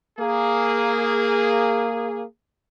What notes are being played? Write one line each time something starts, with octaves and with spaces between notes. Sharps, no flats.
A#3 G#4